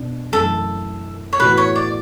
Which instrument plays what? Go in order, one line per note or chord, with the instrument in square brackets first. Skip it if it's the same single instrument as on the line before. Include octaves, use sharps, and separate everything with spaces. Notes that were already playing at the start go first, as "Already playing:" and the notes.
Already playing: [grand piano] B2 D4
[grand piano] F#2 E3 A3 [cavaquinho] A4
[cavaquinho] C#5
[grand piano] A2 E3 B3 F#4 [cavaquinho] B4
[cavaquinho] C#5
D5